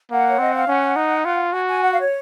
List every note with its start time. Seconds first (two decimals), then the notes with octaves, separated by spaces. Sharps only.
0.10 A#3 F#5
0.28 C#5
0.39 C4 D#5
0.54 F5
0.67 C#4 F#5
0.96 D#4
1.25 F4
1.52 F#4 G#5
1.69 G#5
1.81 F#5
1.91 F5
2.00 C#5